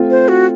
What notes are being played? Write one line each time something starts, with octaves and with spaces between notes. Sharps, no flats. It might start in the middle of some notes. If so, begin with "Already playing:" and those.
Already playing: A3 C4 F4
C5
F#4